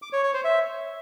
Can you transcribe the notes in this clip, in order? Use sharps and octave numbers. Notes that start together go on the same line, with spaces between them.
D6
C#5
C#5
C5
E5